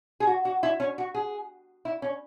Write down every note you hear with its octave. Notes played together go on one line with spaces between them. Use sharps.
G#4
F#4
F#4
E4
C#4
F#4
G#4
E4
C#4